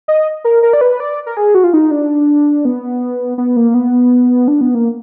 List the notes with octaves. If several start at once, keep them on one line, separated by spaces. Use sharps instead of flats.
D#5
A#4
A#4
D5
B4
D5
A#4
G#4
F#4
F4
D#4
D4
B3
B3
A#3
B3
D4
B3
A#3